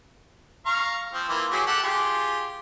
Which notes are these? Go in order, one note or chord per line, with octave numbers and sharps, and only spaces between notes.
F5 A#5 C#6
F3 C4
E3 A#3 F4
F#3 G4 G#4
G4 A4 F#5
F4 G4 G#4